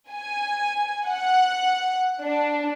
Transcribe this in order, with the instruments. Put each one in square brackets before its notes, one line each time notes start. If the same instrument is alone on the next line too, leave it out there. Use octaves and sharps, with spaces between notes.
[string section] G#5
F#5
D4